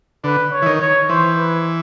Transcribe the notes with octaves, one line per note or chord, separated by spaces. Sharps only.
D3 B4
C#5
E3
D#3
C#5
E3 C5
B4